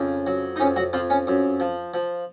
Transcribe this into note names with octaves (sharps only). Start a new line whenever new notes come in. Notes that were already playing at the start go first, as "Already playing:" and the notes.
Already playing: F2 C#3
F#3
D#4
F2 C#4
F#3 F#4
F2 F3 F4
C#4
F#2
F3
F3